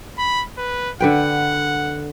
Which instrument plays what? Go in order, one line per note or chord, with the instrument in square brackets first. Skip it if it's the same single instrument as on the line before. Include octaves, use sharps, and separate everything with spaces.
[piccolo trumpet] B5
B4
[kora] D3 B4 G5 [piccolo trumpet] F#5